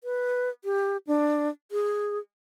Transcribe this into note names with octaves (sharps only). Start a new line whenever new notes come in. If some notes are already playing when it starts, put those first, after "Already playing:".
B4
G4
D4
G#4